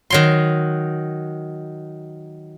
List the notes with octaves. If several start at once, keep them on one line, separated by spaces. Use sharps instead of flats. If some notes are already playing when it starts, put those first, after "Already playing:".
D#3 F#3 C6